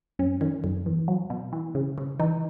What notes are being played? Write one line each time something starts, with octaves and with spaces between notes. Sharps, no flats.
F#2 C#4
D#3 C#4
F#2
E2
F#3
B2
E3
C#3
C#3
E3 D#4